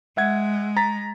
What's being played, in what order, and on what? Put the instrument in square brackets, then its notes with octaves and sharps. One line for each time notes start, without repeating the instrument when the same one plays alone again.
[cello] G#3 [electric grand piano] E5 F#5 G#6
[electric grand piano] A#5 A6 B6